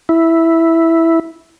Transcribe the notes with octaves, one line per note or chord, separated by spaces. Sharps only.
E4